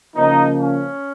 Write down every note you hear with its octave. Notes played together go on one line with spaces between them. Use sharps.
C#3 F3 A#3 D#4
C#4